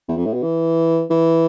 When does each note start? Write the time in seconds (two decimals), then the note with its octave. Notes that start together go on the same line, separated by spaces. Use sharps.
0.09 E2
0.17 F2
0.26 A2
0.34 B2
0.43 E3
1.10 E3